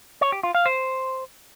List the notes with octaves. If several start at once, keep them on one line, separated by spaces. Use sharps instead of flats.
C#5
G4
F4
F5
C5